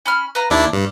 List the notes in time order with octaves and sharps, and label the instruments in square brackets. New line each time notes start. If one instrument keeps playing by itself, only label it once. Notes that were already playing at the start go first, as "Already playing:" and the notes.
[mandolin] C#4 B5 F6
B4 F5 A#5
[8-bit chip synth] D#2 D4 E4 [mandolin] D6
[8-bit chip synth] G2